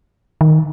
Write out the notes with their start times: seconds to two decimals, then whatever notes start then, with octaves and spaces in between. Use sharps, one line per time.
0.41 D#3